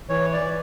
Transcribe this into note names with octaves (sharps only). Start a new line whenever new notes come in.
E3 C#5
D5
E3